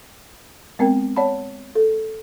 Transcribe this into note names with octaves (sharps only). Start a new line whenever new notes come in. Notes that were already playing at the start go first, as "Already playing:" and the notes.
G#3 B3 C4 A#4 G5
C#5 D5 F#5 A5 B5
A4